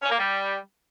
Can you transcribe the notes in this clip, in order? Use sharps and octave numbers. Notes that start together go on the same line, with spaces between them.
C#4
A#3
G3